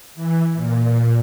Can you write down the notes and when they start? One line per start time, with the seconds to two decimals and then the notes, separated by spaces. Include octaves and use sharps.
0.15 E3
0.55 A#2